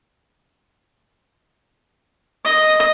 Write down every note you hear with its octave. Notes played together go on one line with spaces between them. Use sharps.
D#5